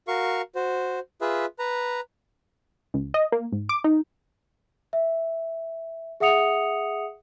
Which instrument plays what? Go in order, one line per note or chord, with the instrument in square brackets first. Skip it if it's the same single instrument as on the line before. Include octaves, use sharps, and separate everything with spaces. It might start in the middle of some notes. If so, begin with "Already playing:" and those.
[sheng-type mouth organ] F#4 A#4 F5 C#6
F#4 C5
F4 G#4 B4 E5
B4 A#5
[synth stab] C#2
D#5
A#3
G#2
D6
D#4
[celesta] E5
G#4 E5 F#5 D#6 C#7 F7